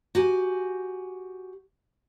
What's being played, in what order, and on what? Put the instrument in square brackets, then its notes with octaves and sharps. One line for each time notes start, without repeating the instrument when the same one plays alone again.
[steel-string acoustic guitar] F#4 G4 G#5